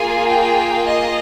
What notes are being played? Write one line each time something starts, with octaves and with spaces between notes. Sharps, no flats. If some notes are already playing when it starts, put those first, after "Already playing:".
Already playing: A#3 F4 G#4 G#5
G5
D#5